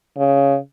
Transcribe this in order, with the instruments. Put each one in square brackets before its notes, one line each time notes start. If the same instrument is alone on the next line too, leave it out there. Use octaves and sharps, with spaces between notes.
[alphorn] C#3